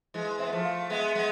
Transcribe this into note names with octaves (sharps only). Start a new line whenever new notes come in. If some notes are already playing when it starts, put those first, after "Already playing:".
E3 G#3
C4 E5
B3
F3 A3
F5
G#3 B3 E5
G#3 B3